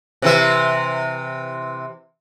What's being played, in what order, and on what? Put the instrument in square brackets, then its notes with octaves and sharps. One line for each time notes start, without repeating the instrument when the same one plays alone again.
[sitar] C3 E3 E5